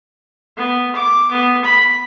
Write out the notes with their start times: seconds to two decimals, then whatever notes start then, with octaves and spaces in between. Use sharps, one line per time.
0.57 B3
0.95 D6
1.31 B3
1.64 B5